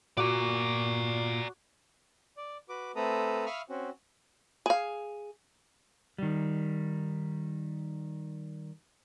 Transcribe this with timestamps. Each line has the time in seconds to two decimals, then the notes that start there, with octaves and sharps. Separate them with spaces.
0.17 A#2 F#4 D5 A#5 D6
2.37 D5
2.69 F#4 B4 D6
2.96 A3 C4 A4 B4 A#5 D#6
3.46 E5 F5 B5 C#6 D#6 F6
3.69 C4 C#4 F#4
4.66 G#4 F5
6.18 D#3 G3